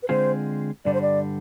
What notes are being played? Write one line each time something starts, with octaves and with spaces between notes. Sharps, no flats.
B4
D3 G#3 C4 F4 G#4 C5
G2 D3 G3 D5
C5
D5